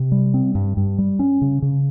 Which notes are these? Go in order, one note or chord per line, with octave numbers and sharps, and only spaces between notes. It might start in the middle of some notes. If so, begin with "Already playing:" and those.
Already playing: C3
G3
C4
G2
G2
G3
C#4
C#3
C#3